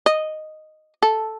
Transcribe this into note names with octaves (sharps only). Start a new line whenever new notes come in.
D#5
A4